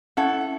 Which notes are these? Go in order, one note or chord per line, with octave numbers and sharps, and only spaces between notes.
C#4 E4 A4 F#5